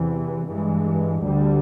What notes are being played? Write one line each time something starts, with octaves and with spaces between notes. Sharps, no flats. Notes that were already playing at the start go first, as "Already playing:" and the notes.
Already playing: E2 C3 E3
G2 E3 G#3
D2 D3 G3